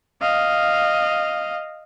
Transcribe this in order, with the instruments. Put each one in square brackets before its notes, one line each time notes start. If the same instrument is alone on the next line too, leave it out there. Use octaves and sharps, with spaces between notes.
[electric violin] D#5 F5